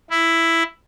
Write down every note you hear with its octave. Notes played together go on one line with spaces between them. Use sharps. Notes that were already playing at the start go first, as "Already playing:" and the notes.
E4